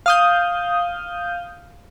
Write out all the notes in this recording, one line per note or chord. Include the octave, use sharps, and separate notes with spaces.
F5 D#6 G6